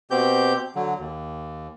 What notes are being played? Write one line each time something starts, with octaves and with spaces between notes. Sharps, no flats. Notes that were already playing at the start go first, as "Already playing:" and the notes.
B2 C4 G4 G6
D3 F#3
D#2